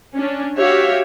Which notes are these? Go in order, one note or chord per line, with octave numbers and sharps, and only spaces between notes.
C#4 D4
F#4 G4 C#5 E5 F5